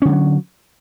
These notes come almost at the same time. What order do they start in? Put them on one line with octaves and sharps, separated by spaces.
C#4 D3 G3 F#3